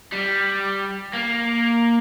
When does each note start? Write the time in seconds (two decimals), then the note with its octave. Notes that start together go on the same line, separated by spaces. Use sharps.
0.13 G3
1.13 A#3